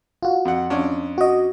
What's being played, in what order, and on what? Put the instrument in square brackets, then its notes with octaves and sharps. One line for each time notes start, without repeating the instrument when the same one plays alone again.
[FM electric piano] F4 F#4
[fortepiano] F2 F#5
F2 C#4 D4
[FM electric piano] F#4 D#5